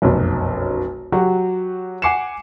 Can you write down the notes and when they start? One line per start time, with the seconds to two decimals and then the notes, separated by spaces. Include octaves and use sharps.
0.02 F1 B1 F#2
1.12 F#3 F#4 G4
2.02 F#5 G#5 D6 C7 C#7 E7